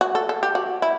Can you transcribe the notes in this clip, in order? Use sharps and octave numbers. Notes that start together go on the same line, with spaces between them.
F#4
A4
A4
G4
F#4
E4